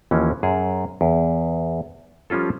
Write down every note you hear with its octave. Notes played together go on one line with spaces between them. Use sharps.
D#2 E3 F3 C#4
F#2 G#4
E2
F3 G3 C#4 F4 A4